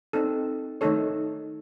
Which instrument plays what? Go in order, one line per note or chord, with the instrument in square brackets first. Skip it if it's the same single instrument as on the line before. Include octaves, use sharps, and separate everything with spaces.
[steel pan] C4 D#4 A4
D#3 A3 D#4 A4 C#5